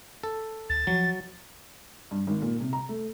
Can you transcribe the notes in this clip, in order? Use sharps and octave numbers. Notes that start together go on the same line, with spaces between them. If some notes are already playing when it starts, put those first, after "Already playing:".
A4
D2 A6
F3 F#3
G2
G#1
A#2
C3
A#5
A3